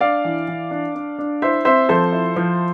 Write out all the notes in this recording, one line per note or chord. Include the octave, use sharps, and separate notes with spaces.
D4 D5 F5
E3
E3
D4
D4
D4
E4 C5 E5
C4 C5 E5
F3 A4 C5
E4
F3